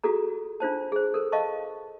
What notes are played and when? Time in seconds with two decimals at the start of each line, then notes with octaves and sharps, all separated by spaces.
0.04 F4 F#4 G#4 A4 A#5
0.60 D4 F4 C5 A5
0.92 G#4 C5
1.14 A4 A#4
1.32 D#5 F5 A5 C#6